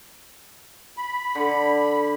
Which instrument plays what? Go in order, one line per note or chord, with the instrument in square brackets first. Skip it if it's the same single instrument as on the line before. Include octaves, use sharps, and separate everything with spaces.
[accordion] B5
[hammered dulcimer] D3